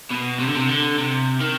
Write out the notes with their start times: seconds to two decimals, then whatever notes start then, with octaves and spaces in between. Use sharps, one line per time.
0.10 B2
0.40 C3
0.47 D3
0.55 C3
0.69 D3
0.98 C3
1.41 D#3